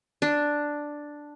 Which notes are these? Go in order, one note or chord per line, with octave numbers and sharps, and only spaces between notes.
D4